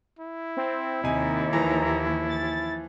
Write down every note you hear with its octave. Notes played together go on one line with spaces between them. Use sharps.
E4
C4
D#2 C3 D#4 G#5
E3 F3 A#5
A6